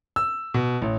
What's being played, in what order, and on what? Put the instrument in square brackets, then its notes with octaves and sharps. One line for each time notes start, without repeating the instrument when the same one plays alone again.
[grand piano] E6
B2
A1